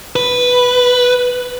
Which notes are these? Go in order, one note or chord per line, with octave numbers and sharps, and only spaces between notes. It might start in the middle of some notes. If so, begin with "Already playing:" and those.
B4